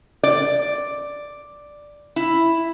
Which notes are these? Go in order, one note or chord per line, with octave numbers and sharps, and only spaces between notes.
D5
E4